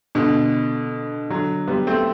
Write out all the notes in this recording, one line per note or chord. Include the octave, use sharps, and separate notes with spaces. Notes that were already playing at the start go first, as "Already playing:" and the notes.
B2 D3
D3 F#3
G3 B3
A3 C4